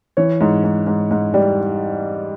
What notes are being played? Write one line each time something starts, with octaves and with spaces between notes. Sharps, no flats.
E3 C#5
G#2
G#2
G#2
G#2
G3